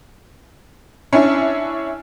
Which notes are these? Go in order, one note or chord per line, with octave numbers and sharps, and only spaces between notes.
C#4 D4 E4